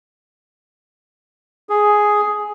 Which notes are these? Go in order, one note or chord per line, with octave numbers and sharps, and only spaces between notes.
G#4